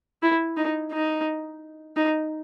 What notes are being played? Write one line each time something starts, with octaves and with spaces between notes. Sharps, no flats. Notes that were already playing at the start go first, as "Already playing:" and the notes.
E4
D#4
D#4
D#4